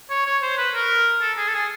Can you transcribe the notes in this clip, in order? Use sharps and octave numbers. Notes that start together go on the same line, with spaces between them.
C#5
C#5
C5
B4
A#4
A4
G#4
A4
G#4